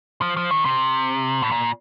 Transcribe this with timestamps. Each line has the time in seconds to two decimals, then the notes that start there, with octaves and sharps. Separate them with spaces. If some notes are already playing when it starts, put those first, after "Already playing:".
0.22 F3
0.37 F3
0.51 D#3
0.65 C3
1.42 A2
1.52 A#2